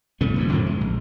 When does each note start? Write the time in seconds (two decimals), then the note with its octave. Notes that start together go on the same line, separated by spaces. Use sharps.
0.21 C#3 G3 A3 B3
0.36 F#1 D#2 G#2 F3
0.52 A1 F#2 D3 C4
0.66 G#3
0.81 A#1